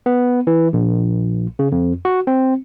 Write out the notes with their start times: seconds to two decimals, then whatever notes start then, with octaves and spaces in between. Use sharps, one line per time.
0.06 B3
0.47 E3
0.73 A#1
1.59 C#3
1.72 F2
2.05 F#4
2.27 C4